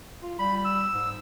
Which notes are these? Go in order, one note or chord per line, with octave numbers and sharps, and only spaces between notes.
F4
G3 B5
E6
G#2